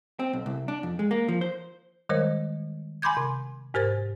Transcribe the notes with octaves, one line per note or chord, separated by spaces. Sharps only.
C4
B1
C2
D4
F2
G#3
A#3
F3
C5
D#3 G3 G#3 A#4 C5 D#5
G#5 B5 C6 D6 G6 G#6
C3
G#2 G4 A#4 C5 A6